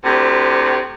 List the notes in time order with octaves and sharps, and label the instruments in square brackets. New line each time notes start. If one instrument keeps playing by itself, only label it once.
[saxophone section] D2 A2 C3